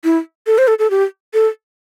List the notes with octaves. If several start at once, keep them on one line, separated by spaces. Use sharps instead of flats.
E4
A4
C5
A4
A4
G4
A4